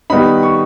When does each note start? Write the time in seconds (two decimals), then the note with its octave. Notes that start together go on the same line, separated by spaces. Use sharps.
0.10 D#3 G3 B3 D#4 B5
0.43 C#6